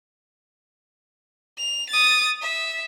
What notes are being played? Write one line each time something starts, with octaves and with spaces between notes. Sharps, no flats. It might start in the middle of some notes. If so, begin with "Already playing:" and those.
F7
D#6 A6
E5